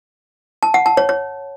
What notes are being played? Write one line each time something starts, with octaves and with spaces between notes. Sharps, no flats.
A5
F#5
A5
C#5
C#5